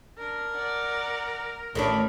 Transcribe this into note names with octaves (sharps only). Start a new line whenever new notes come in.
D4 A#4
D5 F#5
A1 D#3 A3 D4 C#5 B5